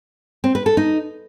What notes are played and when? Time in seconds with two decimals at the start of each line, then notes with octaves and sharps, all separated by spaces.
0.44 C4
0.55 B4
0.66 A4
0.77 D#4